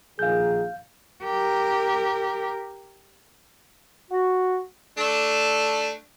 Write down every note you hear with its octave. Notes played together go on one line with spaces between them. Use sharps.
A#1 D#3 G#4 F5 G6
G4 A#4
F#4
A3 D4